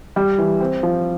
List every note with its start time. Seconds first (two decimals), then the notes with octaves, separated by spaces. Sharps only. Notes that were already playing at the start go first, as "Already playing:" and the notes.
0.16 G3
0.38 E3
0.60 C4
0.83 F3